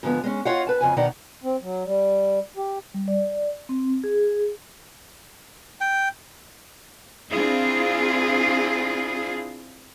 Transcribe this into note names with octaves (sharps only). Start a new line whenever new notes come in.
G#2 D3 F3 B3
G#3 C#4
F4 C#5 D#5 F5 F#5
B4 A5
F2 C#3 G#5
B2 D#3 D#4 D5 F#5 A#5
C4
F#3
G3
G4
G3
D5
C4
G#4
G5
C4 D4 E4 F4 G#4